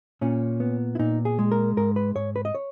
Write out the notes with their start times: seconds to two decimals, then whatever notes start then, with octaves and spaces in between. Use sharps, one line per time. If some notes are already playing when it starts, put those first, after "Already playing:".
0.21 A#2 C#4
0.60 B3
0.95 E4
0.99 A#2 D#4
1.25 G#4
1.39 G#3
1.52 A#4
1.77 G#2 A#4
1.96 B4
2.16 G#2 C#5
2.36 B4
2.45 D#5
2.55 C#5